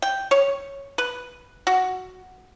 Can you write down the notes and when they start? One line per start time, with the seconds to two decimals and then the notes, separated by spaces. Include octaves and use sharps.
0.02 G5
0.31 C#5
0.98 B4
1.67 F#4